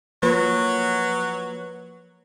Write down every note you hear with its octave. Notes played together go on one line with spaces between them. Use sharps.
F3 F#3 A#3 B4